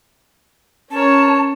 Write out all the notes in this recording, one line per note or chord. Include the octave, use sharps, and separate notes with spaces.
C#4 A#4 C#5 A5